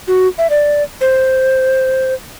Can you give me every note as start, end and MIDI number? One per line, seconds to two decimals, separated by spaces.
0.08 0.28 66
0.38 0.50 76
0.50 0.83 74
1.01 2.14 72